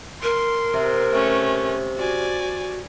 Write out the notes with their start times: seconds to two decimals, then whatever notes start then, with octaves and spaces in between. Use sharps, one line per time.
0.23 A#4 C6
0.74 C3
1.12 A3 C#4
1.98 F#4 D5 G#5